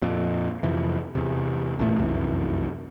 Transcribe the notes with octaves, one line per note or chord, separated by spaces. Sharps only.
F2 A#2
F2 C3 E3
E2 C3
A1 E2 A#2 A3
F1 C2 F#2 E3